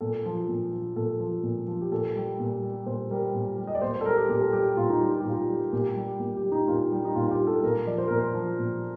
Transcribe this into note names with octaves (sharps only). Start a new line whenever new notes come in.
A#2 A4
F3
A#2
F3
A#2 A4
F3
A#2
F3
G4
A#2 A4
G3
A#2
G3
A#2 C5
G3 A#4
A#2
G3
D#5
D5
A#2 C5
C5
A4
G3 A#4
G4
A#2 G4
A4
G3 G4
A#2 F4
D#4
G3 F4
F4
G4
A#2 F4
G3
A#2 G4
G3
A#2
G4
G3
D#4
A#2 F4
G3
D#4
A#2 F4
F4
G4
G3
A4
A#2 A#4
F3 D5
C5
A#2 A#4
C5
F3
A#2